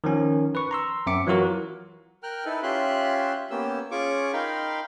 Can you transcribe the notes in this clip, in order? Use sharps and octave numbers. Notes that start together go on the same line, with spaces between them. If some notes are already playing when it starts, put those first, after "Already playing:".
D#3 F3 C#4
B4 C#6
A#5 C6 E6
F#2 C4 E5 D6 C#7
E3 F#3 F4 F#4 A#4
A#4 G5 F6 F#6
D#4 E4 A4 B4
C#4 F4 G4 E5 C6 F#6
A#3 B3 C#4 G4 E6
C#4 F4 G#4 C#6 D6
D#4 A#4 F5 G5 B5 C6